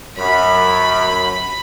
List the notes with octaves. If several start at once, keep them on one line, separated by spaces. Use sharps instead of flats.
F#2 B5